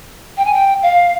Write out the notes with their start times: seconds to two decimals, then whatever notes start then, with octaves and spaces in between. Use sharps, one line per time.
0.37 G5
0.45 G#5
0.53 G5
0.83 F5